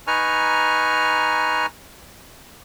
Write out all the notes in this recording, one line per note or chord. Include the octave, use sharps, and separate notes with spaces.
D#4 B4 G#5 A#5 C#6 F6